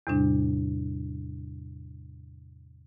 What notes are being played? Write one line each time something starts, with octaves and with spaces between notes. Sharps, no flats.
E2 A2 C3 G3 D4